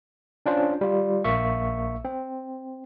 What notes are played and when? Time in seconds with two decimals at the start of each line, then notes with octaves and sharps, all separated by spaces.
0.46 C#4 D4 F4 C5
0.81 G3 F4
1.24 A#1 A#3 E5 C#6
2.05 C4